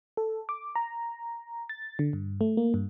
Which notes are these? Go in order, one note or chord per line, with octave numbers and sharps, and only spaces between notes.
A4
D6
A#5
A6
D3
G2
A3
A#3
G2